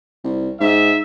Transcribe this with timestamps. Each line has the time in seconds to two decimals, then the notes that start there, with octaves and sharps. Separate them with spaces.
0.24 C2
0.60 G#2 E5